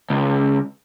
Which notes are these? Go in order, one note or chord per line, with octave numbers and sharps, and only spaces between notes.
C#2